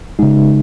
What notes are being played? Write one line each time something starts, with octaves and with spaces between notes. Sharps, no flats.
C#3 G#3 D#4